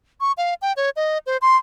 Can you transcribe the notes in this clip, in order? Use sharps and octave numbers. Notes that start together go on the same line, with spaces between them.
C#6
F5
G5
C#5
D#5
C5
C6